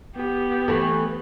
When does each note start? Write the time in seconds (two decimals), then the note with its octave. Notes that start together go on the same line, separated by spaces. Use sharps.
0.17 B3 G4
0.68 E3 A3